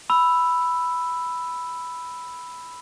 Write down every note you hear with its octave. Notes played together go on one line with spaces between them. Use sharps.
B5 E6